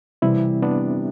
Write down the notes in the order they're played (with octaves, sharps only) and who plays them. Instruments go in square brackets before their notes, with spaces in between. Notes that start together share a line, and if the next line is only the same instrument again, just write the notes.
[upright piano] C3 E3 G3 [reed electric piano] C4 E4
[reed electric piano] B3 D4